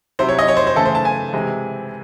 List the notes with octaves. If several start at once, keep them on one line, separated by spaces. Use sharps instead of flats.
C3 F#3 C4 E4 C5
C#5
D#5
C#5
C5
C5
C#3 E3 A3 A4
C5
A5
G#5
C3 E3 G#3 C4